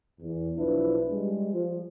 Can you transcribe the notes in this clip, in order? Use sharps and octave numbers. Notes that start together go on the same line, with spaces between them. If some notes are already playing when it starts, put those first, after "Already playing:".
E2
B1 F3 D4 E4 B4
G3 G#3
F3